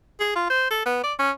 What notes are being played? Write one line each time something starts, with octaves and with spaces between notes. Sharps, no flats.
G#4
F4
C5
A4
B3
D5
C#4